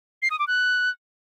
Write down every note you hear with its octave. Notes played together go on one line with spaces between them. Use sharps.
C7
D#6
D6
F#6